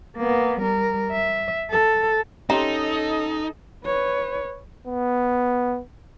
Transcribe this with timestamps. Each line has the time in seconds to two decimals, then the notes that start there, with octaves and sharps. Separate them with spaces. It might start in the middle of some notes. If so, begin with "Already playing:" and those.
0.17 A#3 B3
0.61 G3 A#4
1.12 E5
1.70 A4
2.50 C#4 D#4 G4 A4 D#5 E5 A#5 C6
3.85 B4 C#5
4.87 B3